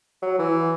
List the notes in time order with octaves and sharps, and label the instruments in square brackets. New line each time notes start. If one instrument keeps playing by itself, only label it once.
[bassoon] F#3
E3